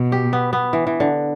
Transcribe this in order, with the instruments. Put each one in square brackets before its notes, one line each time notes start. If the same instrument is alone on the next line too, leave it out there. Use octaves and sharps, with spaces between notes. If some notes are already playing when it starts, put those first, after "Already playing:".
Already playing: [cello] B2
[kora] G4
B3
B3
E3
E3
D3